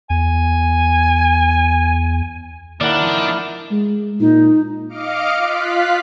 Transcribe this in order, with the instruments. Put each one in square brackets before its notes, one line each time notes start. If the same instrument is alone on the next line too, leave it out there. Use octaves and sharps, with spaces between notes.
[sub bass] E2 [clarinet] G#5
[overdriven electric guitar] D#2 [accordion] A#3 E4 F6 [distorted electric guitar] D4 [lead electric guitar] D5 F#5
[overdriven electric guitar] F3 D#4
[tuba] G#3
[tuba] A#2 [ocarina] D#4
[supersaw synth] D#5 F5 D6 F6 C#7 D7
F4 F5 F#6 B6